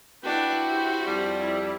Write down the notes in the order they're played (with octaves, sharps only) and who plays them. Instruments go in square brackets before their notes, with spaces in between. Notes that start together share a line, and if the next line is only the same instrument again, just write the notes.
[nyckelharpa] D4 B4 [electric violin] E4 F#4 [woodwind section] G5
[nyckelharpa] G4 C5
[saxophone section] F2 G3
[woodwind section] E4